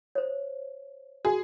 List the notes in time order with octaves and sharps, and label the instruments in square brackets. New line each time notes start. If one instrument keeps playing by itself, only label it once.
[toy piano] C5 C#5
[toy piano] F#4 [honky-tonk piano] G#4